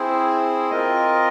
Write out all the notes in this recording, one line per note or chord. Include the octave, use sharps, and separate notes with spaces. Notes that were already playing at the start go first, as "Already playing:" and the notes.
Already playing: C4 E4 G#4 C5
C4 F4 A#4 D#5